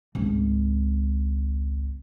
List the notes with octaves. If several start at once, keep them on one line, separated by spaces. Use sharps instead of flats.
G#1 C#2